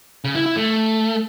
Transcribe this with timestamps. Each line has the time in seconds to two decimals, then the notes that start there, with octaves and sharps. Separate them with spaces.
0.24 C#3
0.35 E4
0.46 E4
0.57 A3